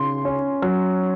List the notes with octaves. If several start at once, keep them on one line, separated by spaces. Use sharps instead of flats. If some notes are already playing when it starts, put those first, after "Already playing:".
Already playing: C#3 C6
C#4
F#3